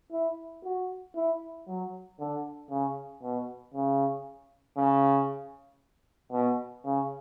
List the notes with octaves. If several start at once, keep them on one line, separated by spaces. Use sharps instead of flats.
E4
F#4
E4
F#3
D3
C#3
B2
C#3
C#3
B2
C#3